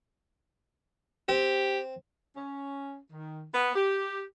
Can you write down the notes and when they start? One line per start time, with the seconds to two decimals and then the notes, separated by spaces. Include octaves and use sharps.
1.29 C4 G4
2.34 C#4
3.11 D#3
3.52 B3
3.75 G4